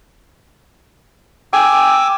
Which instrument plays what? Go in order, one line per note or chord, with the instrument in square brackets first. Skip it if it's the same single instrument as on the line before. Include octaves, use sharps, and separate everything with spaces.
[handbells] G5 [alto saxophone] G#5 [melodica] D6 E6